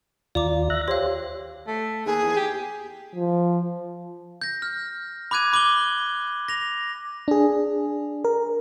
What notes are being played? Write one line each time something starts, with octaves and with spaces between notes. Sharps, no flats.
D#2 F4 D5 A#5 D6
E5 F#6 A#6
G4 C5 C#5 F5
A3
D#2 G#4
E2
G4
F3
G6 A#6
F6
B5 D6 F#6 G#6 D#7
B5 D6 D#7 F#7 G7
A#6 F7
D4 G#4
A#4